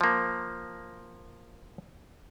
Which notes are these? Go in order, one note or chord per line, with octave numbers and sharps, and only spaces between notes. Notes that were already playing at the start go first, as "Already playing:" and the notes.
F3 A#3